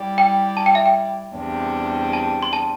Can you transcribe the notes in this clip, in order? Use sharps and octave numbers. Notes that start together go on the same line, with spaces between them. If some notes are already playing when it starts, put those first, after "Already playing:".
Already playing: G3 E4 G4 D5
G5
A5
G5
E5
G5
E2 C3 G3 D4
A5
C6
A5